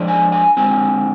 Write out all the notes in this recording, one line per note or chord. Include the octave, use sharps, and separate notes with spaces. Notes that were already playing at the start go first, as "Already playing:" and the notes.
Already playing: F3 G#3 D4
G#5
G#5
D3 G#3 C4 G#5